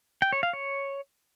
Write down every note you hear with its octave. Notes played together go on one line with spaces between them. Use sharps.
G5
C#5
F5
C#5